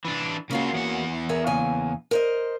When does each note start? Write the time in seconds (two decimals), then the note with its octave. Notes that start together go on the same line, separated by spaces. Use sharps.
0.05 E3 D4
0.51 C#3 A#3 C#4 F4 F#4
0.73 E2 F#5
1.29 G#4 A#4 E5
1.47 C#3 A#3 G#5
2.11 A#4 C5 D#5